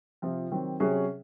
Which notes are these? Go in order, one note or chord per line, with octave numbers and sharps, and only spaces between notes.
C3 F3 C4 F4
D#3 F#3 C4
C3 F#3 C#4 G#4